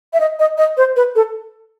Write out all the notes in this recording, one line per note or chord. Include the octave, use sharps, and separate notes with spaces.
E5
D#5
D#5
D#5
C5
B4
A4